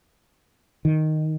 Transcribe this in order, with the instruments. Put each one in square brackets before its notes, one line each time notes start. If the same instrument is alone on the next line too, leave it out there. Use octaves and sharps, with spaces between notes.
[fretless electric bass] D#3